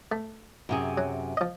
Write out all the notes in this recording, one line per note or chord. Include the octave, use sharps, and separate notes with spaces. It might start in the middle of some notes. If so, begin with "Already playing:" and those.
A3
F#2 C3 G#4
F#3
F3 D#5